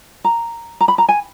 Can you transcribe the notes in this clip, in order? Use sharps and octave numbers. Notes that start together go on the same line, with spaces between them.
A#5
A#5
B5
A#5
G#5